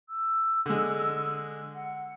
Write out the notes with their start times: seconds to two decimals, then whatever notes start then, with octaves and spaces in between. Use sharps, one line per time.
0.09 E6
0.66 D3 G#3
1.74 F#5